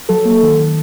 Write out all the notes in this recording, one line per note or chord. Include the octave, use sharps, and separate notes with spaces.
F#3 A4
A#3
D#3
D#3